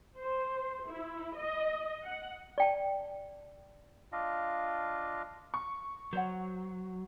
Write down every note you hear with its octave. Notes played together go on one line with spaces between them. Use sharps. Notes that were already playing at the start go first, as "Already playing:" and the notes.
C5
E4
D#5
F#5
D5 G5 A5
D4 F4 D#5 F5
C#6
F#3 C5 C#5 F#5